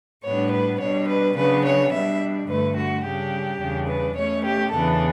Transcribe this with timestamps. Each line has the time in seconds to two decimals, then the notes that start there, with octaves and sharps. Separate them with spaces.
0.24 A2 G3 B3 D4 C#5
0.51 B4
0.79 B2 G3 D4 C#5
1.08 B4
1.35 C#3 F#3 B3 D4 B4
1.64 C#5
1.92 B2 G3 D4 E5
2.48 G2 D3 A3 B4
2.76 F#4
3.04 C#3 G3 D4 G4
3.59 E2 C#3 G3 D4
3.88 B4
4.16 B2 A3 C#4 C#5
4.44 G4
4.72 E2 C#3 E3 B3 D4 A4